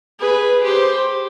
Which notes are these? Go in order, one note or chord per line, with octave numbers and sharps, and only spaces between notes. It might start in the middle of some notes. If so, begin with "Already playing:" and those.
G#4 B4
G4 C5